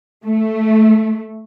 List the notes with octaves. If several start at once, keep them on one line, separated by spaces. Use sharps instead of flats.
A3